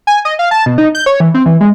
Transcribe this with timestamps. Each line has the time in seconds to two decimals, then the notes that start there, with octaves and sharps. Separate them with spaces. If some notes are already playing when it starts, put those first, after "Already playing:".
0.07 G#5
0.25 D#5
0.39 F5
0.51 A5
0.66 B2
0.78 D#4
0.95 G6
1.06 C#5
1.20 E3
1.34 C4
1.46 E3
1.61 G#3